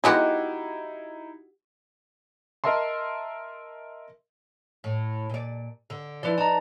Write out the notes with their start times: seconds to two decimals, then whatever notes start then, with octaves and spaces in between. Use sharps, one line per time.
0.04 F#3 G#3 B3 D#4 E4 F#4 G4 D#5
2.64 A#4 D#5 E5 A5 C6
4.84 A2
5.29 A#2 D5
5.90 D3
6.23 F3 E4 B4 D5
6.38 D#4 A5 A#5